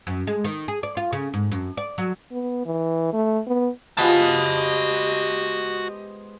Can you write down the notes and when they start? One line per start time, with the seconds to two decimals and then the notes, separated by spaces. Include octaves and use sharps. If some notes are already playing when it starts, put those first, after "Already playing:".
0.07 F#2
0.27 G#3
0.44 D#3
0.68 G#4
0.83 D5
0.97 F4
1.13 C#3
1.34 G#2
1.51 F#2
1.77 D5
1.98 F#3
2.32 B3
2.66 E3
3.13 A3
3.47 B3
3.97 F3 G#3 B3 F#4 G4 D#5 A5